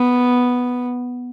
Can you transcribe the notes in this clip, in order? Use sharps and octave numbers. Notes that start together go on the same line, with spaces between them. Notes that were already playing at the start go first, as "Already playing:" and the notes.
Already playing: B3